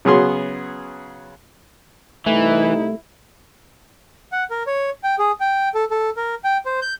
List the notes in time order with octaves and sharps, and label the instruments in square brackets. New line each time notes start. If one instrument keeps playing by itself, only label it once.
[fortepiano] C#3 F#3 B3 G#4 C6
[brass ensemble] C2 D#4 [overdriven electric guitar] E3 [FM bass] A3 [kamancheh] E4
[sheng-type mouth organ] F#5
A#4
C#5
G5
G#4
G5
A4
A4
A#4
G5
C5
G6